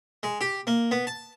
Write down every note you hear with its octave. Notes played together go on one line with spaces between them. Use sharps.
G#3
G4
A#3
B3
A5